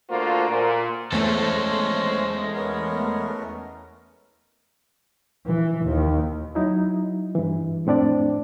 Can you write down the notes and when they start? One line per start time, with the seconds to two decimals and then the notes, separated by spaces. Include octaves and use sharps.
0.10 D3 A3 A#3 F4 F#4 C5
0.49 A#2
1.12 E2 G#3 A3 C#4 A4 C5
2.53 B3 C#4 A#4
5.46 E3
5.85 D#2
6.55 F#3 D#4 E4
7.35 G2 E3
7.86 F2 A2 C4 D4 D5